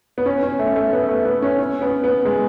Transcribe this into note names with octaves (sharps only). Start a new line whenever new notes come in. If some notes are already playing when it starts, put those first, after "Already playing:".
B3
C#4
C#4
A3
A3
B3
A3
B3
C#4
C#4
B3
B3
G#3